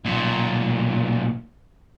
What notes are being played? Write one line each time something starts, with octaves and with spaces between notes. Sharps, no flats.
B1 A#2